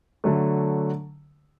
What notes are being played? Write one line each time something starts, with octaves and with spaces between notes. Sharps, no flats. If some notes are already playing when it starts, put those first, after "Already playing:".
D3 F#3 A3